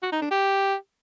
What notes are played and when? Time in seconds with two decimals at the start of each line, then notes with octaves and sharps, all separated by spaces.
0.03 F#4
0.12 D#4
0.21 D4
0.31 G4